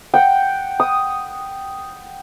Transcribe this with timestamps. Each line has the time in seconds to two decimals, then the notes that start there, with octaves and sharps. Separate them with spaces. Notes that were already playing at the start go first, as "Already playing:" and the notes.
0.14 F#5 G5
0.80 D#6